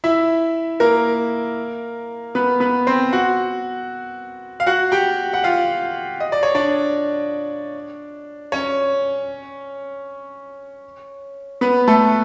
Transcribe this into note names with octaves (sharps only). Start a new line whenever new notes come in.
E4 E5
A#3 A#4
B3 B4
B3 B4
C4 C5
F#4 F#5
F5
F#4 F#5
G4 G5
F#5
F4 F5
D#5
D5
C#5
D4 D5
C#4 C#5
B3 B4
A3 A4